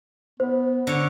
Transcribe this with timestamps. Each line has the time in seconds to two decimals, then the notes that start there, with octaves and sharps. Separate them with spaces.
0.40 B3 C5
0.87 D3 C#5